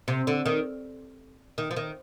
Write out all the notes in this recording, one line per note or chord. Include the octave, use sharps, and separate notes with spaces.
C3
D3
D#3
D#3
F3
D#3